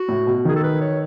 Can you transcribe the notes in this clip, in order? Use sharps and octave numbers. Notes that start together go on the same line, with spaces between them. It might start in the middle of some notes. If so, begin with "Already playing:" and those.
Already playing: F#4
A2
B2
D#3 G#4
A4
B4
C#5